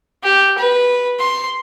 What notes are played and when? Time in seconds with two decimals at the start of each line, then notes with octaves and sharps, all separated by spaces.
0.24 G4
0.58 B4
1.19 C6